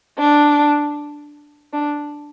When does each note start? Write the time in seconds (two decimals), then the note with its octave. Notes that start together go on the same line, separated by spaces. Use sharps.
0.17 D4
1.73 D4